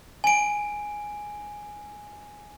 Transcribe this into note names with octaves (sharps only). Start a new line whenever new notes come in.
G#5 D7